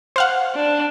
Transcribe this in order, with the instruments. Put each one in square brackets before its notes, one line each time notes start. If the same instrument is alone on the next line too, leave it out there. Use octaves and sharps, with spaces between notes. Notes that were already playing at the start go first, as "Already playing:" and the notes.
[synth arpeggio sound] C5 F5 F#5
[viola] D4